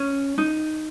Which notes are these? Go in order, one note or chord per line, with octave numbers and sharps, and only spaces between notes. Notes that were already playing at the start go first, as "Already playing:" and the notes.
Already playing: C#4
D#4